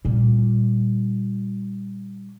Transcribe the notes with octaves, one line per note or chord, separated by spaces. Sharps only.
A#2 G3